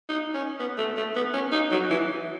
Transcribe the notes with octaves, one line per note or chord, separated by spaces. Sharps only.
D#4
C#4
B3
A3
A3
B3
C#4
D#4
F#3
E3